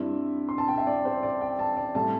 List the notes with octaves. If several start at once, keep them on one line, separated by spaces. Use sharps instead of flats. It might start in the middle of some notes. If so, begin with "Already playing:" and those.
Already playing: G2 G3 C4 E4 E5
C6
A5
G5
E5
D5
C5
D5
G5
A5
D5
A2 G3 C4 A5